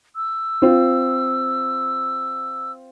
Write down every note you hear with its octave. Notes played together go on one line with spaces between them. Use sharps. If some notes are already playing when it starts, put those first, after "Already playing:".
E6
C4 F4